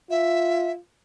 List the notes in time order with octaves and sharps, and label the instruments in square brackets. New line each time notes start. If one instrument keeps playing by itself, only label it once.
[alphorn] F4 [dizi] E5